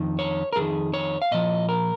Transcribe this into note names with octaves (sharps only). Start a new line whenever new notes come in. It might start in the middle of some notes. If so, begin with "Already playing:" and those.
Already playing: F2 D#3
C#5
A#4
F2 D#3 G#4
C#5
F5
A#2 F3 D#5
A#4